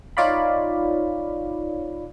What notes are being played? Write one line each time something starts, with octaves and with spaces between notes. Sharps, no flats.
D#4 F4 C#5 D5 F5 B5